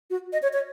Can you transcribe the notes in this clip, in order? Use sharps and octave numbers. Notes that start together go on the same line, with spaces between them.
F#4
D#5
C#5
C#5